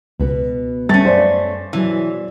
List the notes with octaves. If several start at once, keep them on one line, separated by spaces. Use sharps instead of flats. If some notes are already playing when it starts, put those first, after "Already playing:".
C#2 B2 B3
D3 G3 A3 C#4 A6
F#2 C5 D5 F5 G#5
B2 E3 F#3 G#4